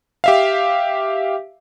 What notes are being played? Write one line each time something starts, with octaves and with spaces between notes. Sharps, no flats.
G4 E5 F5